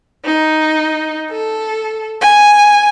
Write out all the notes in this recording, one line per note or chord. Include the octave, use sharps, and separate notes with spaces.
D#4
A4
G#5